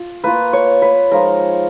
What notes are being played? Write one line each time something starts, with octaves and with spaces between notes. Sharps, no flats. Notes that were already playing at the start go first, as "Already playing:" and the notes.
Already playing: F4
A#3 F4 B4
C#5
B4
F3 G#3 D#4 A#4